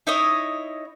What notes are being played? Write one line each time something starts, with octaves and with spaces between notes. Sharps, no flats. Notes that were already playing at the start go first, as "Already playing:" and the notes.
D#4 E4 C#5 D#5